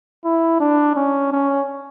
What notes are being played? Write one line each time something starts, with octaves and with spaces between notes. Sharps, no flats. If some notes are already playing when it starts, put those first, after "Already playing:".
E4
D4
C#4
C#4